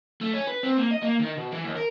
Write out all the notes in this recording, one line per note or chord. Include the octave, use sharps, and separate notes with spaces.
A3
C#4
B4
C4
A#3
D#5
A#3
D#3
B2
E3
D#2
A#4